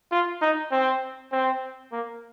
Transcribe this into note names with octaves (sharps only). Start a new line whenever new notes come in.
F4
D#4
C4
C4
A#3